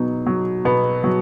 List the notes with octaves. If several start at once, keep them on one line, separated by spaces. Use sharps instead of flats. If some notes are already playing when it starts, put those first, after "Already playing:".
Already playing: B2 F#3 D#4
F#3
B2 B3
F#3